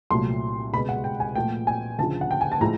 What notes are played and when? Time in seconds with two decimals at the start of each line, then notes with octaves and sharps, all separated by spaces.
0.11 C2 A#2 F#3 A3 C6
0.73 C#2 B2 G#3 B5
0.89 F#5
1.04 G5
1.20 G#5
1.35 A#2 F3 A3 G5
1.67 G#5
1.99 D2 C#3 F3 A5
2.21 F#5
2.31 G5
2.41 G#5
2.52 A5
2.61 A2 F3 G#3 A#5